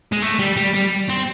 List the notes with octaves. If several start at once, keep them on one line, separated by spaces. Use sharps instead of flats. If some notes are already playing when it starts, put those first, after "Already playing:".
G#3
A3
G3
G3
G3
C4